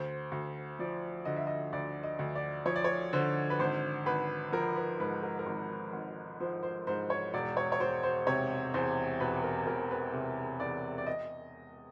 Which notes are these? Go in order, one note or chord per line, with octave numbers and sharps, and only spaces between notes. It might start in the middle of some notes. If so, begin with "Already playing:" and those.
Already playing: D2 C5
D2
F3 D5
D3 D#5
E5
D#5
D2 D5
D#5
D2
D5
F3 C#5
D5
C#5
D3 C5
B4
G#1 C5
G#1 B4
F3 A#4
B4
G#2 B4
A#4
A#4
G#1
G#1
F3 C5
C5
G#2 C5
C#5
E1 D5
C#5
C#5
E1 C5
C5
C3 C#5
E2 C5
E1 B4
A#4
E1 A#4
B4
C3
E2 D5
D5
D#5